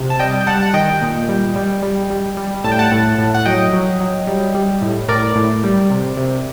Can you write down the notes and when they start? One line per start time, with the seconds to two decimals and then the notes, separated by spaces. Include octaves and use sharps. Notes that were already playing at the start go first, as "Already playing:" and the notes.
Already playing: C3
0.10 A5
0.19 G3 D#5 G5
0.41 G5
0.47 G3 F#5 A5
0.62 F#5
0.74 D#3 D#5 G5
1.01 A#2
1.29 G3
1.56 G3
1.82 G3
2.10 G3
2.37 G3
2.64 A2 A5
2.72 G5
2.79 F#5 A5
2.92 A2
3.18 A2
3.34 F#5
3.45 F#3 D#5 G5
3.73 F#3
4.00 F#3
4.27 G3
4.55 G3
4.82 A2
5.08 A2 A#4 D5
5.36 A2
5.64 G3
5.90 C3
6.17 C3